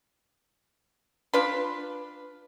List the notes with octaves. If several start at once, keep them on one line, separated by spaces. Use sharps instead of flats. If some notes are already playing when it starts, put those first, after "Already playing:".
D4 F4 B4